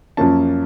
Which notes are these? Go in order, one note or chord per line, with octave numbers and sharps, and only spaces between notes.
F#2 F3 A#3 C#4 A5